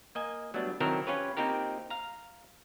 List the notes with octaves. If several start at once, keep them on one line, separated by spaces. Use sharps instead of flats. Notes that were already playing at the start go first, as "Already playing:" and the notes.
A#3 D#5 G#5
F#3 G3 A3 B3 D4
D#3 F#3 C4 E4 A4 A#4
C#4 F4 G4 B4 C#5
A#3 C4 D#4 F4 G4 A#4
F5 A#5